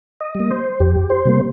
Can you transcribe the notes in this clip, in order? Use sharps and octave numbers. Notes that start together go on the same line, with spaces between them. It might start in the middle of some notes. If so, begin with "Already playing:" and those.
D#5
G3
A#3
C5
F2 G4
C5
C3 G3 A#3